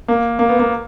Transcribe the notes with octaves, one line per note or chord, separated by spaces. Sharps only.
A#3
A#3
B3
A#3